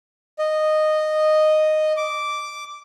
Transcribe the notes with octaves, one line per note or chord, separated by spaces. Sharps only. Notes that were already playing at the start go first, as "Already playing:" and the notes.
D#5
D6